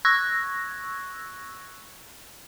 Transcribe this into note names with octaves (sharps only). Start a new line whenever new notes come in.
C#6 E6 F#6 G#6 A#6